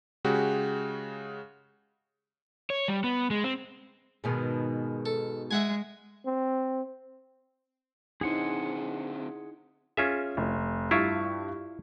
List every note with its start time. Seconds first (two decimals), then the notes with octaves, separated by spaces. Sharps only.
0.25 C#3 G#3 F#4 G4
2.70 C#5
2.88 G3
3.04 B3
3.31 G#3
3.44 C4
4.24 G#2 B2 D#3
5.06 A4
5.51 G#3 E5 F#5 G#5
6.26 C4
8.21 D3 C4 D#4 E4 G#4 F#5 C6
9.97 C#4 F4 G#4 E5
10.37 F1
10.91 G2 E4 F4 G4 C#6